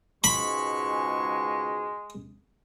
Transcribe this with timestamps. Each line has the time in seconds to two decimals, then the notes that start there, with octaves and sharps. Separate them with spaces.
0.24 C#2 G#2 B2 G#3 B5 C#6